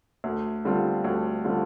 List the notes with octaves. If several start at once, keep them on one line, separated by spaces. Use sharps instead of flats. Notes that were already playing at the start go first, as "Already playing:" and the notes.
D2
D3 G3 C4 F4
D2
D3 G3 C4 F4